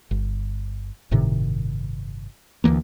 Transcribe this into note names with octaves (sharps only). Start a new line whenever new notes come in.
G1
G1 A2 C3 D#3
D2 E3 G3 A#3